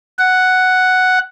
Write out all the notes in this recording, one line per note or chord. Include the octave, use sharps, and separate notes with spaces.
F#5